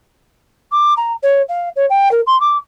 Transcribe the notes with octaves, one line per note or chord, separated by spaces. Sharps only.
D6
A#5
C#5
F5
C#5
G5
A#4
C6
D6